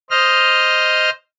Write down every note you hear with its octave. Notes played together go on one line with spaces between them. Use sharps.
C5 D#5 F6